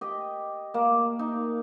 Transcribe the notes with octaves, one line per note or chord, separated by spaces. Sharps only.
G4 D#5
A#3
D#4